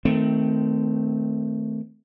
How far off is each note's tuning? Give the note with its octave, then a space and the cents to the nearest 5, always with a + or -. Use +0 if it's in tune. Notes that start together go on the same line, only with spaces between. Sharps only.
D#3 +15 A3 +0 C4 -15